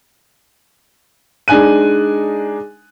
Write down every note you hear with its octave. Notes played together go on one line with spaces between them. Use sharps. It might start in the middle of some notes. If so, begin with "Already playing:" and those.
G#3 D4 D#4 G#5 F#6 D#7